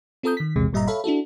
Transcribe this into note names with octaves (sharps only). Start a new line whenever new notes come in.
C4 F4 A4 A#5 D#6 G6
D#3 B6
A#1 E2 C3 G#3
G1 A#2 G3 D#5 E5 A#5
A4 C#5 E5 F5 B5
D4 E4 F#4 A4